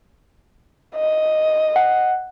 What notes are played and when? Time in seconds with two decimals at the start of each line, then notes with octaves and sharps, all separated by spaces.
0.96 D#5
1.76 F#5